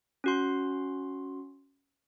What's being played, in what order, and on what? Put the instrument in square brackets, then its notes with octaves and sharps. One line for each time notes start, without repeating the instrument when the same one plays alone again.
[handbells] C#4 F#4 C6